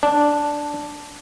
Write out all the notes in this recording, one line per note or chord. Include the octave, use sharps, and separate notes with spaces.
D4